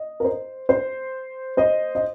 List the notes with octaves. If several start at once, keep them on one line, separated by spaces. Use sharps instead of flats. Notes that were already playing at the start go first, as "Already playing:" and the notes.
Already playing: D#5
A#4
C5
C5
C5 D#5
D#5